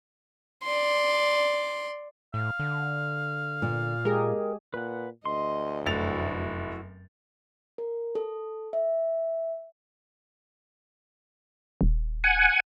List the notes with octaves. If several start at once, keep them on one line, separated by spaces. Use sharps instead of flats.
D5 C6
A2 F5
D3
A#2
G#3 G4 G#4 A#4
A#2 B4 F#5
D2 D#5 C6
F1 F#2 E4 F#4 A6 F7
A#4
A4
E5
D#1
F#5 G#5